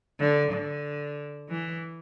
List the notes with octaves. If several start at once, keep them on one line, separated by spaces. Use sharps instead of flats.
D3
D3
E3